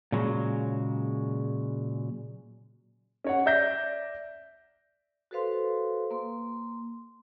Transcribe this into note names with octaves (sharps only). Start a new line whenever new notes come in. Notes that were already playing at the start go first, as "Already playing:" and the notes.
A#2 C#3 F#3 G#3
C#4 C#5 F#5
D5 E5 G6 A#6 B6
F#4 A4 B4 C5 F5 C6
A#3 C6